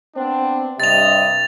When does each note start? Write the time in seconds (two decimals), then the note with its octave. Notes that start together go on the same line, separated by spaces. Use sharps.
0.16 B3 C4 D4
0.80 G2 C3 D#5 A6 F7